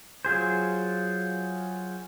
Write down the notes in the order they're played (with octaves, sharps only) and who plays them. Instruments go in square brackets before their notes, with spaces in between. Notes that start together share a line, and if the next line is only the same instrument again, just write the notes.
[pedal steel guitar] F#3 F4 G#4 C5